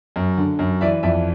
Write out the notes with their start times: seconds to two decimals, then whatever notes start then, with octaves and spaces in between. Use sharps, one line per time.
0.16 F#2
0.38 D3
0.59 F#2
0.81 E3 D5 E5
1.03 F2 D5 E5